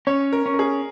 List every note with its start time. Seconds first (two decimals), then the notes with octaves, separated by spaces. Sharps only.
0.07 C#4 C#5
0.33 A#4
0.46 C#4
0.54 A#4
0.59 G#4